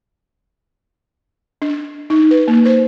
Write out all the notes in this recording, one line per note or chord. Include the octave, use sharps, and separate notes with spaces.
D4
D#4
B4
A#3
C5